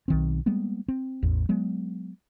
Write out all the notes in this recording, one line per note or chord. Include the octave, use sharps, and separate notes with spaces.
B1 D#3 C4
G3 G#3 A#3 B3
C4
A1 E2
F#3 G#3 B3